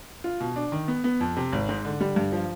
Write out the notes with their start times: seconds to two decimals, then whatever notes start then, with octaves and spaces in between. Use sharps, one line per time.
0.24 F4
0.40 B2
0.56 D4
0.72 D#3
0.88 B3
1.04 B3
1.20 F2
1.37 C3
1.52 G#1
1.69 G#2
1.85 D3
2.01 G3
2.16 G2
2.32 F3